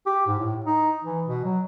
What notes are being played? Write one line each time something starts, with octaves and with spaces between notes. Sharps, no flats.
G4
G#2
A2
D#4
E3
B2
F#3